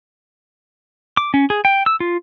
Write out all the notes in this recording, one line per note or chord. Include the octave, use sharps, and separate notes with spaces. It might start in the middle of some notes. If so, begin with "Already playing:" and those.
D6
C#4
G#4
G5
E6
F4